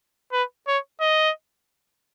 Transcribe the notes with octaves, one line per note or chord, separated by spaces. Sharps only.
B4
C#5
D#5